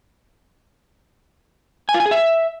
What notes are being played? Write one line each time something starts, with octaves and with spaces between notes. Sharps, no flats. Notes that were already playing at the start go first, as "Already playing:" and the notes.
G#5
F4
G#5
G#4
E5